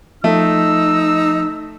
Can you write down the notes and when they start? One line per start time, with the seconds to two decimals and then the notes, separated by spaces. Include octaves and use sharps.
0.24 F3 A3 D#4 E6